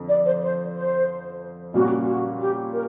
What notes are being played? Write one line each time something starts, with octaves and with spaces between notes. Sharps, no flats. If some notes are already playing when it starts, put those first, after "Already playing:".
Already playing: F2 D3 A3
D5
C5
C5
C5
A#2 G3 A#3 C#4 F#4
F#4
G4
A#4